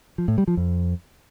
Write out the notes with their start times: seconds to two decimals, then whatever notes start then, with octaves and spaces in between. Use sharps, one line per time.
0.18 F3
0.28 A2
0.38 G3
0.48 F3
0.57 F2